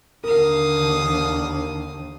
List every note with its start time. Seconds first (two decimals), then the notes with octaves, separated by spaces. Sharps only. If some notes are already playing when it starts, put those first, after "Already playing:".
0.24 D#2 D3 D#3 A#4 F5 D#6